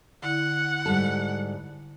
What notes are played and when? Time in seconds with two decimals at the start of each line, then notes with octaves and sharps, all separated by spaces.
0.22 D3 E4 F#5
0.86 G#2 G3 A4